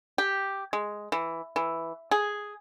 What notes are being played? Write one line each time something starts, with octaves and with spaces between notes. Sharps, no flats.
G4
G#3
E3
E3
G#4